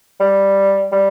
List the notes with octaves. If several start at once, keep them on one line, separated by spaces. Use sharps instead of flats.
G3
G3